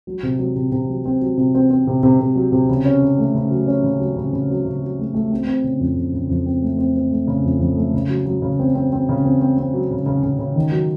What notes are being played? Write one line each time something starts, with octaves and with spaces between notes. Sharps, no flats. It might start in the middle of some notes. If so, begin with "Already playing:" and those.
F#3
C3
F#3
C3
C3
F#3
C4
F#3
C3
C4
C4
C3
C3
C3
F#3
C3
C#3
C#4
C#3
A3
C#3
F#3
C#4
C#3
F#3
C#3
C#3
F#3
C#3
F#3
A3
A3
C4
C4
C#3
F2
C#3
C#3
F2
C4
A3
C4
C4
A3
C#3
F2
F2
A3
C#3
F#3
F#3
C#3
C4
C4
C4
C#3
C4
C4
C4
F#3
C#3
C#3
C#3
C#3
D#3
F#3